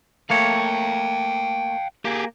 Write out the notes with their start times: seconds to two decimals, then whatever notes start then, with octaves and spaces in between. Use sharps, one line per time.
0.30 A3 A#3 C#5 F5 G5
2.05 A#3 G4 G#4